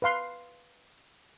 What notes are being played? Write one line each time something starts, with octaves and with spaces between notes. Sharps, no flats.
B4 F5 C6